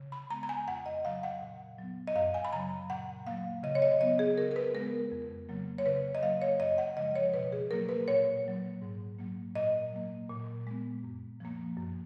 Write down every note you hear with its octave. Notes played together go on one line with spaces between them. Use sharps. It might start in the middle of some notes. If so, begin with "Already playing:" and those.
Already playing: C#3
B5
G#3 B3 A#5
A#5
G#5
F2 F#5
D#5
C#3 F#3 F5
F#5
A#2
F#3 B3
D#5
F#2 F5
G#5
B5
C#3 F#3 A#5
A#2 F#5
F#3 A#3 F5
C#3 D#5
C#5
D#5
F#3 B3 D#5
G#4
C#3 A#4
A#4
B4
G#3 B3 A#4
F2
C#3 F#3 A#3
C#5
C#3 B4
D#5
F#3 A#3 F5
C#5
F#2 D#5
F#5
C#3 F3 G#3 D#5
C#5
B2 B4
G#4
F#3 A#3 A#4
B4
A#2 C#5
F#3 A#3
G#2
F#3 A#3
A#2 D#5
F#3 A#3
A#2
G#3 B3
F#2
F3 A#3
F#2